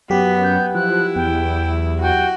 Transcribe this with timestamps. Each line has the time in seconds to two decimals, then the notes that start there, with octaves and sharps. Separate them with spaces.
0.10 F#2 F#3 B3 G4 B6
0.44 G6
0.75 F3 E4 F#6
1.16 E2 G5
2.02 F#4 G5